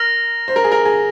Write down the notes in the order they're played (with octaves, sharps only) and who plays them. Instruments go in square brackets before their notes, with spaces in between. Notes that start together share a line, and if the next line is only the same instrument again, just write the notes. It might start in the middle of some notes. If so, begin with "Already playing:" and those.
Already playing: [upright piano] A#4 [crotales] F6 A#6 F7
[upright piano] C5
A#4
G#4
A#4
G#4